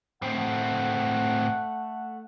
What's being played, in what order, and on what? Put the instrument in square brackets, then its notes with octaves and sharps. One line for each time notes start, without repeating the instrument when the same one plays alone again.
[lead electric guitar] A2 C4 [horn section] A3 F#5